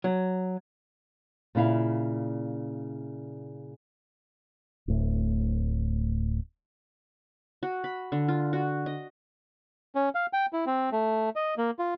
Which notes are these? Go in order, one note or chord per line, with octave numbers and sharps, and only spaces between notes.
F#3
A#2 C#3 E4 F5
D1 A2
F#4
B5
D3
F4
F#4
D#5
C#4
F5
G5
E4
C4
A3
D#5
A#3
F4